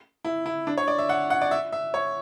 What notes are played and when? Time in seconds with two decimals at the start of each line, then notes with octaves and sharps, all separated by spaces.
0.25 E4
0.46 E4
0.67 D4
0.77 C#5
0.88 D5
0.98 E5
1.09 F#5
1.30 F#5
1.41 D5
1.51 E5
1.72 E5
1.94 C#5